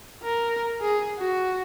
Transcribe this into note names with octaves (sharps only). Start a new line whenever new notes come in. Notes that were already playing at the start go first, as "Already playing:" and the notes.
A#4
G#4
F#4